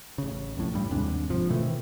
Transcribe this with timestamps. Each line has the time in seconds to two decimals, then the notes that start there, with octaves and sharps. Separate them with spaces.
0.18 A1 C#3
0.56 C2 F2 A2
0.74 G2 G3
0.91 D#2 G#2 C3 D4
1.29 F#1 C3 F3
1.49 B2 D#3 E3 A3